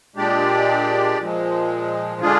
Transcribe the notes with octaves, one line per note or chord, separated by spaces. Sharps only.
A#2 G#3 D4 G4 D5
A#2 F3 G#3
D3 G#3 D4 F4 G#4